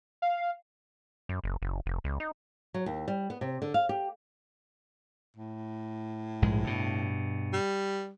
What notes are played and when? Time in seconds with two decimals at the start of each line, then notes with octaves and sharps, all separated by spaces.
0.22 F5
1.29 F#2
1.44 F#1
1.62 F#1
1.86 F1
2.04 C#2
2.20 D#4
2.74 F#3
2.86 D#2
3.08 G3
3.30 B3
3.41 C3
3.62 D3
3.74 F5
3.89 G4
5.36 A2
6.42 A#1 G#2 G#3
6.64 G2 B2
7.53 G3